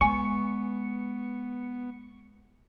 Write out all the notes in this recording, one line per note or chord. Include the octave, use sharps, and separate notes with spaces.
G#3 B3 G#5 C#6